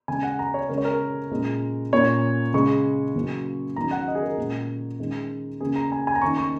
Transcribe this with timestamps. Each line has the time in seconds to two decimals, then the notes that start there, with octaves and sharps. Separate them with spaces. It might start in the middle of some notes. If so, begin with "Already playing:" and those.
0.08 C#3 G#3 C#4 G#5
0.23 F#5
0.39 A#5
0.54 C#5
0.69 C#3 G#3 C#4 A#4
0.78 C#5
0.85 A#4
1.31 A#2 G#3 C#4
1.92 A#2 A#3 C#4 C#5
2.54 C#3 G#3 C#4 C#6
3.16 C#3 F#3 A#3 C#4
3.76 D#3 F#3 C#4 A#5
3.91 F#5
4.08 D#5
4.15 G#4
4.22 A#4
4.37 A#2 G#3 C#4
4.99 D#3 G#3 C#4
5.61 C#3 A#3 C#4 G#4
5.76 A#5
5.92 G#5
6.07 G#5
6.15 A#5
6.21 D#3 A#3 C#4 C#6
6.37 C#6